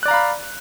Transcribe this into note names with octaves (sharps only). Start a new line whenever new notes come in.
D5 F5 A#5 B5 F#6